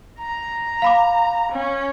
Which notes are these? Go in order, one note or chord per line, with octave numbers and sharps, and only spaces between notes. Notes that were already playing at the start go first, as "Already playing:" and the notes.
A#5
F5 B5 D6
C#4